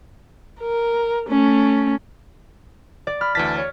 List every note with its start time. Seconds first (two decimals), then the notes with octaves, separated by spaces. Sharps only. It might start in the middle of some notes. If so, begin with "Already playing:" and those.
0.61 A#4
1.29 A3 C#4
3.07 D5
3.21 B5 F6
3.35 D2 E3 A5 A6 B6
3.57 C#5